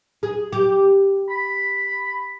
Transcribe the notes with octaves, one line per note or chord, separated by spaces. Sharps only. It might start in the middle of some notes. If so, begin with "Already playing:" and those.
G#4
G4
B5